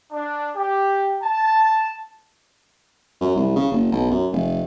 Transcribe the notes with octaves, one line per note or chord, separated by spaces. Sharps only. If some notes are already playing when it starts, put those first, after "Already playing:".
D4
G4
A5
F#2
C2
C#3
F#1
B1
F#2
F1